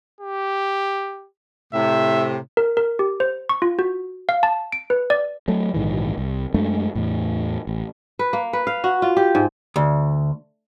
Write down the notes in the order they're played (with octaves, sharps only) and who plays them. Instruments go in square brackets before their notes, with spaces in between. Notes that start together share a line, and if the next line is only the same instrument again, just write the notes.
[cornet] G4
[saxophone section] A2 C3 [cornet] E5
[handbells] A#4
A#4
G4
C5
C#6
F4
F#4
F5
A5
D7
B4
D5
[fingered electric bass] F#3 A3
A#1 G#2 D#3 E3
C2
F#2 G#3 A3 D4
E2 A2
A1
[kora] B4
A#3
B4
F5
F#4
F4
G4
G#2
[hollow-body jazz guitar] D2